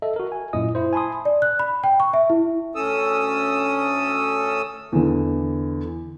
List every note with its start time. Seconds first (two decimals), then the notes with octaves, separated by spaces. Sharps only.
0.02 A4 D#5 E5
0.16 F#4 A#4
0.32 G#5
0.53 F#2 A#2 E4 D#5 D#6
0.75 E4 C5
0.93 G#5 A5 B5 C6 D#6
1.25 D5
1.42 F#6
1.59 B5
1.84 G5
2.00 C#6
2.14 E5
2.30 E4
2.75 D2 C#4 A4 D#6 E6
4.92 E2 D3